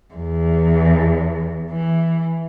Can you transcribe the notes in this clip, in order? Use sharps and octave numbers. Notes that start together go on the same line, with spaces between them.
E2
E3